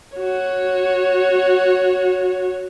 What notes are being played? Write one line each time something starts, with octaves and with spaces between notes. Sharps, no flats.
F#4 C#5